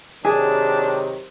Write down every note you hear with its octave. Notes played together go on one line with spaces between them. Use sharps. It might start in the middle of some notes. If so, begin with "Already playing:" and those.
C3 D#3 F#3 D4 G#4